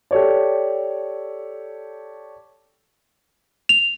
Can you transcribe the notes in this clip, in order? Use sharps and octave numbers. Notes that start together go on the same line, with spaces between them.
G4 A4 C#5 D5
F7